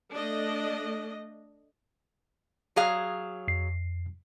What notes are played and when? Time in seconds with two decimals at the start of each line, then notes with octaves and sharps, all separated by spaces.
0.14 A3 D4 D#5
2.76 F#3 G#4 F5
3.48 F2 C7